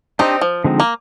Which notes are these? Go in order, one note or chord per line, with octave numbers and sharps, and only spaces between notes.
C4 D4 D#4 G4 C5 D#5
F3
D3 F3 G#3 C4 D#4
A#3